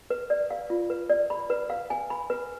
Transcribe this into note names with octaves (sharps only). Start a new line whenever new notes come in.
B4
D5
F5
F4
B4
D5
B5
B4
F5
G#5
B5
B4